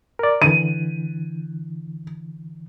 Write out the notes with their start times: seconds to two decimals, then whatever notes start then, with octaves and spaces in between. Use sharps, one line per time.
0.19 A#4 D5
0.42 D3 E3 D#7